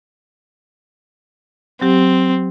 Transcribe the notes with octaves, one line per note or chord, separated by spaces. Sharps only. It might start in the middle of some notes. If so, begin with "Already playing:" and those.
F#3 C4 G4